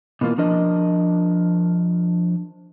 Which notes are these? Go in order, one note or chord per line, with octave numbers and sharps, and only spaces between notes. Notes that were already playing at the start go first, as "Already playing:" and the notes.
B2 E3 A#3 F4 A#4
F3 D4 A#4 D#5